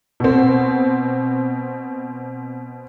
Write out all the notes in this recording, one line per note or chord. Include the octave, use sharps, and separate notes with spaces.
B2 C4